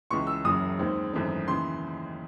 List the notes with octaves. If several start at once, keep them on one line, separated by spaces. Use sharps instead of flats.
C#2 C#3 E3 C#6
E6
F#1 F#2 C#3 E3 D#6
D#2 D#3 G#3 C4
G#1 F#2 E3 A3 C4
D#2 C#3 E3 C6